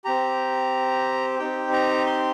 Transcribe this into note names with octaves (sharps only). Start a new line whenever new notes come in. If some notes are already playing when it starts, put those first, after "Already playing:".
C4 G4 A#5
C4 D#4 G4 G5
A#5
C6